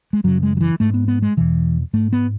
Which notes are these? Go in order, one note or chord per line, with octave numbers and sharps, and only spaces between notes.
G#3
F#2 C#3 F#3
G#3
F#3
E3
G#2 A3
B3
B3
G#3
E2 B2 E3
G#2 A3
B3